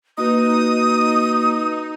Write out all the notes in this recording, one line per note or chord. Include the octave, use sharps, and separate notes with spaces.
A#3 D#4 F#4 B4 D#6